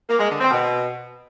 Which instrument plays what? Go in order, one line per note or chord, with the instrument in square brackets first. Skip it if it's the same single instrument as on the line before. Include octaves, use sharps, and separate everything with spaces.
[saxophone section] A#3
G#3
D3
C4
B2